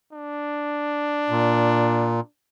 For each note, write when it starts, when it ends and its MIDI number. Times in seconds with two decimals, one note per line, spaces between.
0.13 2.28 62
1.30 2.20 46